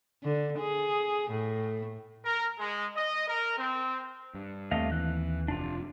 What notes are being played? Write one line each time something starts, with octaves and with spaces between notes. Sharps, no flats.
D3
G#4
A2
A#4
G#3
D#5
A#4
C4
G2
D#2 A3 C4 D#5 F5
E3 F#6
F1 D4 F4